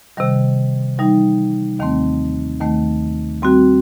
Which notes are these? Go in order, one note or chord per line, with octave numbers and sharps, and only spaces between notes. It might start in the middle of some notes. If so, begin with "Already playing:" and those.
C3 D#3 G3
E3 G3 D#4
D#2 D#3 A3 C4
D#2 D#3 A3
G3 C4 F#4